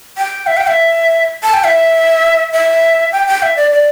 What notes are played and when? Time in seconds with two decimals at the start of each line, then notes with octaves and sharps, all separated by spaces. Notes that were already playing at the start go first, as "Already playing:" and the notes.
0.18 G5
0.47 E5
0.57 G5
0.67 E5
1.43 A5
1.53 G5
1.64 E5
2.53 E5
3.12 G5
3.28 G5
3.42 E5
3.56 D5
3.71 D5